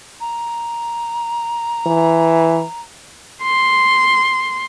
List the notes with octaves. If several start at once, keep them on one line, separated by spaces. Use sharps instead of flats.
A#5
E3
C6